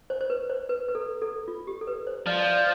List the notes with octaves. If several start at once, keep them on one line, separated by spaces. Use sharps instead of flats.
C5
C5
B4
C5
B4
B4
A4
A4
F4
G4
A4
B4
C5
F3 D5
D5
E5